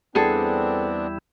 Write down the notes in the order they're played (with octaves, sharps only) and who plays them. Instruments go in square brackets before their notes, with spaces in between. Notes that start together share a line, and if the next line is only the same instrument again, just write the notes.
[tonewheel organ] E2 G3 E4 [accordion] B3 C4 D4 [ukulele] G#4 A4